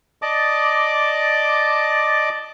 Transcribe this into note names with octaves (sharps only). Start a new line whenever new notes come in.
D5 D#5 A5 D6